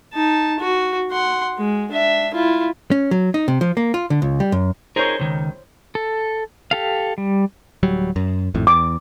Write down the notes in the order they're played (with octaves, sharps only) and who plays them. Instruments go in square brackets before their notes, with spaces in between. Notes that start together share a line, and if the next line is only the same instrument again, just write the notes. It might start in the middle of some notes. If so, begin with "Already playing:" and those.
[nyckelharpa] D#4 A5
F#4
F#5 C6
G#3
D4 E5
E4 F4
[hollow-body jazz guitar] C#4
F#3
D#4
C3
F3
A#3
F4
D3
C#2
G3
F#2
[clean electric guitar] D#4 G#4 A#4 [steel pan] C5 C#5
[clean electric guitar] C#2 D#3
[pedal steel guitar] A4
G4 A4 F5
G3
[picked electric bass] D1 F#3 G3
F#2
G#1 F2 A2
[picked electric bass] E2 [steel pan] D6